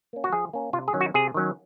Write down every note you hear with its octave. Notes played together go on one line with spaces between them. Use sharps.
A#3 C#4
F#4
F3 G#4
A#3 C#4
C3 F4
G#4
D#3 F#3 C#4
F#4
C3 G#4
D#3 F#3 C#4